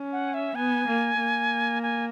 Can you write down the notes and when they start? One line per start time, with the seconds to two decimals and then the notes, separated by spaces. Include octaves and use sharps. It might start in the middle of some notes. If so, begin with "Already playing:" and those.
Already playing: C#4
0.12 F#5
0.34 E5
0.55 B3 G#5
0.87 A#3
1.19 A#3
1.83 G#5